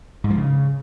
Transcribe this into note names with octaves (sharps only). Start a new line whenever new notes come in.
G#2
F3
C#3